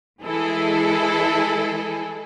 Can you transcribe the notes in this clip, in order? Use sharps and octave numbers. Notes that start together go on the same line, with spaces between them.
E3 G#3 E4 G#4 A4